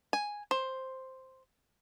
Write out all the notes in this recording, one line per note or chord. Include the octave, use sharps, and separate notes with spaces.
G#5
C5